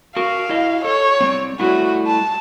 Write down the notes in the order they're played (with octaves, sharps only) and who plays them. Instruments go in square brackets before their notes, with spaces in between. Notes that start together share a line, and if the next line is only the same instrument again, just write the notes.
[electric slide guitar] F#4 A#4 [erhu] F5
[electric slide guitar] E4 F#4 D#5
[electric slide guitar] A4 [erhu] C#5
[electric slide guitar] G3 C4
[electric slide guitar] G3 A3 E4 [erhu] F#4
[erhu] A5